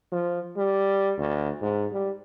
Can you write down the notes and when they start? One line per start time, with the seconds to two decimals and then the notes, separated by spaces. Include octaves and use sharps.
0.12 F3
0.57 G3
1.18 D2
1.62 G#2
1.92 G3